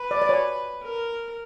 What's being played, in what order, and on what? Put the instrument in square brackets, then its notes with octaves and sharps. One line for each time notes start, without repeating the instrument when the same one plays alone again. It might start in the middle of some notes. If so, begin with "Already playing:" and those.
Already playing: [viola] B4
[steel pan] D5
D5
C#5
[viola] A#4